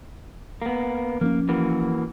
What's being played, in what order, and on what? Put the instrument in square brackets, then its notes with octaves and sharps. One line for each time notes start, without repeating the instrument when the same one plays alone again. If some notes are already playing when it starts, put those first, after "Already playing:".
[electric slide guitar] A#3 B3
[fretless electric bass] F3 C4 C#4 [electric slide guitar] A#3
[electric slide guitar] E3 A#3 F#4